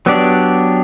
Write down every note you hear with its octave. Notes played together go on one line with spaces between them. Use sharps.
F#3 B3 D4 G4 D5